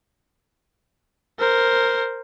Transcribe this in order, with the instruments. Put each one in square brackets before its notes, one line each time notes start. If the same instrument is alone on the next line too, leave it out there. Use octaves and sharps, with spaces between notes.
[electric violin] A#4 C5